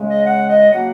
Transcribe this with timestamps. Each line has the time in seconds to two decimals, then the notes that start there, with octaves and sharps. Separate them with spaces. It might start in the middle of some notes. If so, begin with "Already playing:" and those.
Already playing: C#3 G#3
0.09 D#5
0.25 F#5
0.48 D#5
0.70 C#3 F#3 A#3 F#5